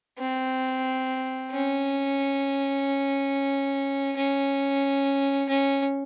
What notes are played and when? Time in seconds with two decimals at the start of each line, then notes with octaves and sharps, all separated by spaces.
0.19 C4
1.51 C#4
4.17 C#4
5.49 C#4